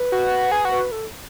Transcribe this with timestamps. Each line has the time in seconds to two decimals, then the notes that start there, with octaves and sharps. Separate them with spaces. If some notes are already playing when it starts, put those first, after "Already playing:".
Already playing: B4
0.12 F#4
0.52 G#4 B4
0.65 F#4
0.72 B4
0.92 A4